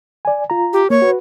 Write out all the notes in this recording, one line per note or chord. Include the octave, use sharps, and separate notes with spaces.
D5 G#5
F4 A#5
G4
A#3 C#5
F#4 B4